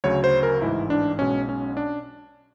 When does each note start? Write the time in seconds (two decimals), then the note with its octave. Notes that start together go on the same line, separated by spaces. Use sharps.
0.04 D2 C#3 F#3 C#5
0.24 C5
0.43 A#4
0.62 A1 G#2 E3 E4
0.90 D4
1.19 B1 B2 G#3 C#4
1.49 C#4
1.77 D4